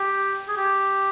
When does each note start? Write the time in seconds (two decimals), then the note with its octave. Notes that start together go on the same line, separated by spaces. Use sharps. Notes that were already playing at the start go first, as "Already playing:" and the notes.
Already playing: G4
0.48 G#4
0.56 G4